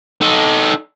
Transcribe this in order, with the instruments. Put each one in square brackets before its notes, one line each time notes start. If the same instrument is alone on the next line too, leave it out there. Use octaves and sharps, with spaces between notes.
[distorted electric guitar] D#4 A4